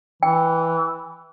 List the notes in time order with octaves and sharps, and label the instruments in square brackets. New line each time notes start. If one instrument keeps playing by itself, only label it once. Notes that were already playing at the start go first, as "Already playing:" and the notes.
[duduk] E3 [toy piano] G5